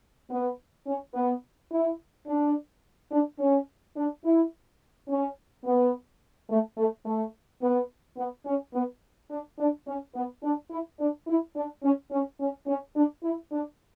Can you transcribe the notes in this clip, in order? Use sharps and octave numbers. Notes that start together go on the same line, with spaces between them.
B3
C#4
B3
E4
D4
D4
C#4
D4
E4
C#4
B3
A3
A3
A3
B3
B3
C#4
B3
D4
D4
C#4
B3
D4
E4
D4
E4
D4
C#4
C#4
C#4
C#4
D4
E4
D4